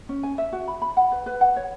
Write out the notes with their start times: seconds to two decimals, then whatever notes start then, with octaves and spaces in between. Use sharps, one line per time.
0.09 C#4
0.23 G#5
0.38 E5
0.52 F#4
0.68 B5
0.82 B5
0.97 F#5
1.12 B4
1.26 B4
1.41 F#5
1.56 C#5